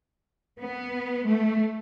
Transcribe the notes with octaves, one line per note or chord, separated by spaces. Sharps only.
B3
A3